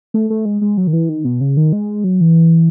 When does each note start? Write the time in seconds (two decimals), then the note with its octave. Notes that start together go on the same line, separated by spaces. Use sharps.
0.14 A3
0.30 A3
0.45 G#3
0.61 G#3
0.77 F#3
0.87 D#3
0.93 E3
1.09 D#3
1.25 B2
1.41 C#3
1.57 D#3
1.73 G#3
2.04 F#3
2.21 E3